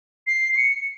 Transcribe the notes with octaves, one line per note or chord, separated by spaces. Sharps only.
C7
C#7